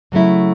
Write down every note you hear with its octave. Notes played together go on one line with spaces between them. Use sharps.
C#3 F#3 A3 E4